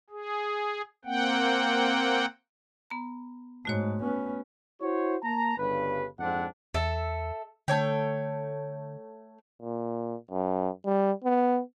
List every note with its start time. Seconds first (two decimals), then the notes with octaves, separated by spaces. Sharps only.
0.10 G#4
1.05 A#3 C4 F#5 G5
2.90 B3 A#5
3.65 G#2 A3 F#4 C#5
4.00 B3 C#4
4.80 E4 F#4 C5 C#5
5.23 A#3 A5 A#5
5.57 G1 G2 C#3 B4
6.19 F2 G#2 C4 D4 F#5
6.74 E2 A4 E5
7.68 D3 A3 C#5 G5
9.62 A#2
10.31 F#2
10.85 G3
11.24 B3